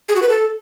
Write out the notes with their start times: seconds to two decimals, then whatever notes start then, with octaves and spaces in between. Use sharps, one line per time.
0.09 G#4
0.16 F#4
0.23 B4
0.29 A4